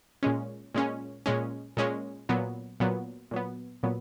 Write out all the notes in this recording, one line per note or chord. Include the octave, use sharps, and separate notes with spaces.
A#2 G#3 C#4
A#2 G#3 C#4
A#2 G#3 C#4
A#2 G#3 C#4
A#2 F#3 B3
A#2 F#3 B3
A#2 F#3 B3
A#2 F#3 B3